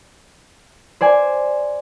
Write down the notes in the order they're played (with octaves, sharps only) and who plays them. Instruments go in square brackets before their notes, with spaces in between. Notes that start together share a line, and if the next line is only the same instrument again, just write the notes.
[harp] C5 D5 G#5